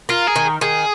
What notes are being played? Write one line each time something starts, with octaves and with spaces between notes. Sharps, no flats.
F4 A#4
G#4
D#3
D#3 G#4